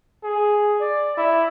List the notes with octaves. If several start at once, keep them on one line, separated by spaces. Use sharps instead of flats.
G#4
D5
E4